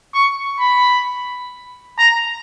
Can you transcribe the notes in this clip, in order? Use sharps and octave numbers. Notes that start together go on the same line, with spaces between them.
C#6
B5
A#5